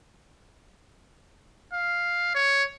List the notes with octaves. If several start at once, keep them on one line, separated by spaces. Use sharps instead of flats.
F5
C#5